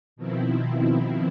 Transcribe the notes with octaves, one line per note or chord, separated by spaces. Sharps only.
B2 D#3 F3 C4 E4